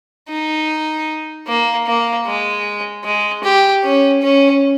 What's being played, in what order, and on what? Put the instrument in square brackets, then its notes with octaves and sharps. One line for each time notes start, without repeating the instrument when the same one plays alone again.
[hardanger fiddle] D#4
A#3
A#3
G#3
G#3
G4
C#4
C#4